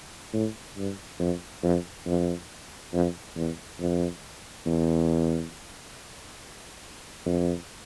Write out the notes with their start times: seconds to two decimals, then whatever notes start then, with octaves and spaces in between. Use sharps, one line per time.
0.33 A2
0.77 G2
1.19 F2
1.63 F2
2.06 F2
2.93 F2
3.36 E2
3.80 F2
4.66 E2
7.26 F2